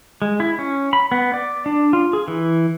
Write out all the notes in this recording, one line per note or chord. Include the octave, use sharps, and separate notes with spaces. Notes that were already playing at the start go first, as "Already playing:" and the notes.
G#3
E4
C#4
B5
B3
D5
D4
F4
G#4
E3